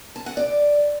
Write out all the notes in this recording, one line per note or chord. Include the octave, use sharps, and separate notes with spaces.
A5
F#5
D5